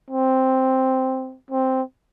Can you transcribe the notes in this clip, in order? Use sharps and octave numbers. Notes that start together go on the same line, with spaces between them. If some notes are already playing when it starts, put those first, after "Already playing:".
C4
C4